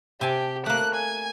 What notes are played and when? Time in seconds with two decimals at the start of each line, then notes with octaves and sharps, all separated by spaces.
0.21 C3 G4 G#5 A5
0.66 A3 A#3 F#6
0.95 G#5